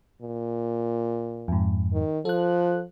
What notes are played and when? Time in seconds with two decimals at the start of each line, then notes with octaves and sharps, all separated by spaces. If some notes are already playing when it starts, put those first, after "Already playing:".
0.22 A#2
1.48 F2 G#2
1.93 D#3
2.25 F3 A4 F#6